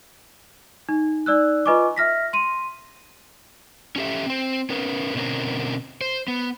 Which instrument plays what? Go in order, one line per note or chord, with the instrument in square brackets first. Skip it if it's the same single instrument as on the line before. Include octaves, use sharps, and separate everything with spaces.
[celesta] D#4
D#4 D5 E6 F#6
F4 B4 D#5 G#5 C#6 D6
E5 F6 A#6 B6
C6 D#7
[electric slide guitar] C#4 D4 G4 A4 E5
C4 C5
C#4 A#4 B4
B2 D3 C4 C#4 A#4
C5
B3